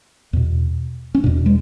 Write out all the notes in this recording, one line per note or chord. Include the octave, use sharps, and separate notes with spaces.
E2 B2
C#4
E2 B2 D4
G#3